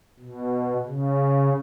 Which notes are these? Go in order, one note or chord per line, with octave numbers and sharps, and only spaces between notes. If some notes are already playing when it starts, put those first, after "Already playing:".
B2
C#3